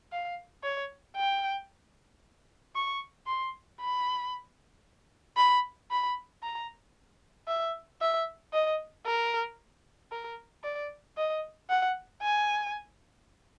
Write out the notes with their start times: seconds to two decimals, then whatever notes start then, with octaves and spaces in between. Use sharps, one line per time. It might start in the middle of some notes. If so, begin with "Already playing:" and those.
0.12 F5
0.64 C#5
1.16 G5
2.75 C#6
3.27 C6
3.80 B5
5.37 B5
5.91 B5
6.43 A#5
7.48 E5
8.01 E5
8.53 D#5
9.05 A#4
10.12 A#4
10.63 D5
11.17 D#5
11.70 F#5
12.22 G#5